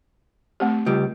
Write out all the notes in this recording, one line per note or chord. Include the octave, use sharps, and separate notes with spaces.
A3 C4 G4
C#2 G3 F4